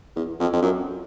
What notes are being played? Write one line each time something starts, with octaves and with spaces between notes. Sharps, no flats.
E2
F2
F2
F#2